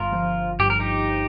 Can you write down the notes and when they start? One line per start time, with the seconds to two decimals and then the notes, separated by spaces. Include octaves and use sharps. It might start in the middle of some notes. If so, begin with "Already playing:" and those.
Already playing: G1 F4 A#4
0.12 F3
0.59 G2 G4
0.70 A#4
0.80 D#4 G4